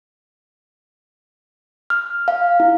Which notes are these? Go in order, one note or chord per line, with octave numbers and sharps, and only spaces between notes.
F6
F5
E4